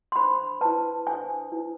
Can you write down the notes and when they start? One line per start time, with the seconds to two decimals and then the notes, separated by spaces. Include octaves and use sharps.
0.12 C6
0.16 D4 A4 C5 B5
0.61 E4 B4 A5
1.07 D4 A4 C5 G#5
1.52 E4 B4